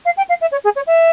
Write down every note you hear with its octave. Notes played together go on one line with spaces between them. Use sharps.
F5
G5
F5
E5
C#5
G#4
C#5
E5